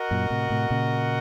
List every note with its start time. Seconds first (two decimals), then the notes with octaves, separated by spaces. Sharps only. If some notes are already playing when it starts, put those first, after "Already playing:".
Already playing: F#4 A#4 D#5 F#5
0.11 F#2 A#2
0.30 A2 C3
0.50 A2 C3
0.70 A#2 C#3